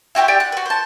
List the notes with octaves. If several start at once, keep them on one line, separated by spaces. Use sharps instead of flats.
E4 F#4 G4 C5
G4 D5 E5 G5
F#5
F#4 B4
C5 A5